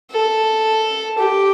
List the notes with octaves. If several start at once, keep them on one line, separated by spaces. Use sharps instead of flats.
A4
G4